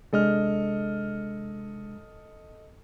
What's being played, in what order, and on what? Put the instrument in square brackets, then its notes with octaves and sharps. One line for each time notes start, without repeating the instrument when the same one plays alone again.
[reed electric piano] C3 G#3 D4 [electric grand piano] A4 D#5 F6